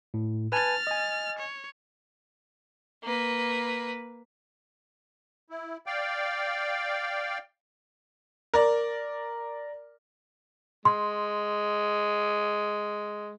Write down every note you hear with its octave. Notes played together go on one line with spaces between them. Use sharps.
A2
B4 G#5 A5 F6 A6
D#5 G#5
C#5
A#3 B4
E4
D5 F5 G5
A#4 D5
G#3 C6